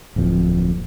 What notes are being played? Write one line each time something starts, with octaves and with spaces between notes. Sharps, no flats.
D1 A#1 F2